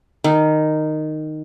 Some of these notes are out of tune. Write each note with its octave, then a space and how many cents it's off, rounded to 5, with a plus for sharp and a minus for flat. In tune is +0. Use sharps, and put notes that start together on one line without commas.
D#3 -10